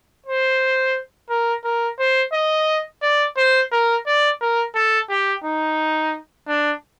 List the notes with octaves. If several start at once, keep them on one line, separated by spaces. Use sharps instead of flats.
C5
A#4
A#4
C5
D#5
D5
C5
A#4
D5
A#4
A4
G4
D#4
D4